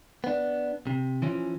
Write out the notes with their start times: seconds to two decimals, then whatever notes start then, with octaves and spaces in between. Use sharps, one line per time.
0.24 B3 D4
0.87 C3
1.22 E3 F3 C#4